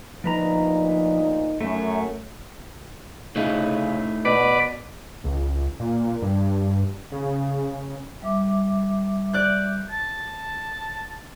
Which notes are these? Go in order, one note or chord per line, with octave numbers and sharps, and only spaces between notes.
D2 A#2 F3 D#4 B4 A#5
F#2 A3
C#3 A3 D#4 E4
B2 B4 D5
C#2
A#2
G2
C#3
G3 E5 D6
D5 F#6 G6
A5